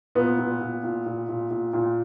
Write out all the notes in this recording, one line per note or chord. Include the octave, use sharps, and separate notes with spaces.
A#2 B3
A#2
A#2
A#2
A#2
A#2
A#2
A#2